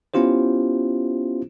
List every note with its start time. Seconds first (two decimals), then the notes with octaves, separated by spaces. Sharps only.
0.14 B3 C#4 E4 F4 G4 C5